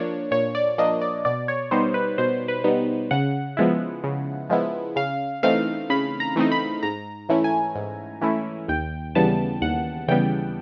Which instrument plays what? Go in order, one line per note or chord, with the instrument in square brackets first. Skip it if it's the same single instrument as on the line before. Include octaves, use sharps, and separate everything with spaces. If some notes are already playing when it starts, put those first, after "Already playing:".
Already playing: [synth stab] F3 A#3 D4 C#5
A#2 C#5
D5
F3 A#3 D4 D#5
D5
B2 D5
C#5
G3 B3 D#4 C5
B4
B2 C5
B4
G3 B3 D#4
C#3 F#5
F3 G#3 B3 E4
C#3
F3 G#3 B3 E4
C#3 F5
E3 A3 C4 D#4 F5
C#3 B5
A#5
E3 A3 C4 D#4
B5
G#2 A#5
E3 A3 C#4 E4
G#5
G#2
E3 A3 C#4 E4
D#2 G5
C#3 E3 G3 B3 A5
D#2 F#5
C#3 E3 G3 B3 G5